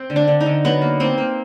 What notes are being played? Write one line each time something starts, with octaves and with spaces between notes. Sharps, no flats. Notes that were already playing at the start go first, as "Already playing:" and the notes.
Already playing: C4
D3
D4
D3
D#4
D3
F#3 B3
A#3
A#3 C4
A#3